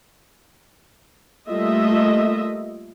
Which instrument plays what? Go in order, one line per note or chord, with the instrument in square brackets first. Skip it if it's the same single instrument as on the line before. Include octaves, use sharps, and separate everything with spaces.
[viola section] G3 A3 A#3 F4 D#5 E5